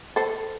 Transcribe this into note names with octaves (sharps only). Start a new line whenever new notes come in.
A4 C5